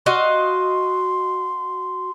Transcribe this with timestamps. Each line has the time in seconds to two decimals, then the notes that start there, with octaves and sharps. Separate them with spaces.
0.06 F#4 D#5 F5 C6